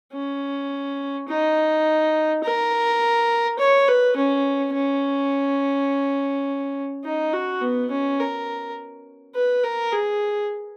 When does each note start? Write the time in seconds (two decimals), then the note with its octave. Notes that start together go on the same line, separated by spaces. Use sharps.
0.13 C#4
1.28 D#4
2.43 A#4
3.58 C#5
3.88 B4
4.16 C#4
4.74 C#4
7.04 D#4
7.33 F#4
7.61 B3
7.91 C#4
8.20 A#4
9.35 B4
9.64 A#4
9.92 G#4